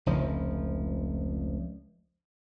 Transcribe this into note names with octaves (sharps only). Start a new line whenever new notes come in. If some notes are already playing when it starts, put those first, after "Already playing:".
F1 C#2 F3